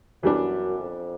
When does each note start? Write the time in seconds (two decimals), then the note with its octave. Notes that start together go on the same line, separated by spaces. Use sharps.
0.23 F#2 E3 G3 B3 D4
0.77 F2